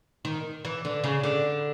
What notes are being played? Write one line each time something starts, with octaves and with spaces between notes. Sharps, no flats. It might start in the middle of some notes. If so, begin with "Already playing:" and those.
D#3
E3
D3
C#3
D3